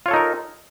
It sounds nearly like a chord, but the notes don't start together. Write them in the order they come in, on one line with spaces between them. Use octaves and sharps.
F4 C#5 A4 D#4 A#4